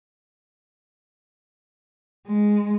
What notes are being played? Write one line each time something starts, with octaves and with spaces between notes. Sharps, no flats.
G#3